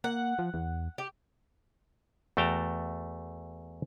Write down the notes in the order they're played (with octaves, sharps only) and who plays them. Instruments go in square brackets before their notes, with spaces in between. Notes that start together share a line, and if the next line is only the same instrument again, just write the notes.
[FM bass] A#3 [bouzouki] F#5
[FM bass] F3
E2
[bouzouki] G4
[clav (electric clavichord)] E2 A3 F#4 G5 A5 A#5